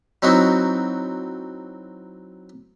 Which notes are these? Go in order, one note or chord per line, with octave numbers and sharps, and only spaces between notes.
F#3 C4 D#4 E4 F#4